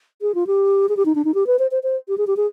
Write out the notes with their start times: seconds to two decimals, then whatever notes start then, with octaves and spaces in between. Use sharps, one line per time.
0.22 G#4
0.35 F4
0.47 G4
0.89 G#4
0.97 G4
1.06 D#4
1.15 D4
1.25 D#4
1.34 G4
1.47 B4
1.59 C5
1.71 C5
1.83 C5
2.08 G4
2.18 G#4
2.27 G4
2.37 G#4